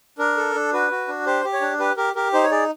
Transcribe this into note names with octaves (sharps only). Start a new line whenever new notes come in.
D4 A#4
A4
D4
F#4 B4
F#4
D4
G4 C5
G4
C#5
D4
G4 B4
G4 A#4
G4 A#4
D#4 C5
C#5
G#4 D5